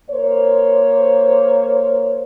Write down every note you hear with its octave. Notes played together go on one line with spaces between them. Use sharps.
A#3 C5 C#5